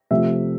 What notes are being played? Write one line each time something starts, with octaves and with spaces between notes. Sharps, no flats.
C3 F3 A3 E5